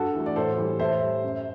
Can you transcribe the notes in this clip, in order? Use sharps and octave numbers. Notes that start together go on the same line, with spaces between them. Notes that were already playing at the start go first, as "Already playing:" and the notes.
Already playing: G2 F#4 A4
E3 A3
D5
A2 A4 C5
E3 G3
A2 C5 E5
G3
F#2